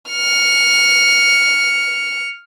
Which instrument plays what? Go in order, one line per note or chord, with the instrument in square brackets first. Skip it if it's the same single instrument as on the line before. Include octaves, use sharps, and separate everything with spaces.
[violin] F6 C#7